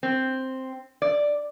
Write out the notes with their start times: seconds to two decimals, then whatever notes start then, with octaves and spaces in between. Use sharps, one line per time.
0.03 C4
1.02 D5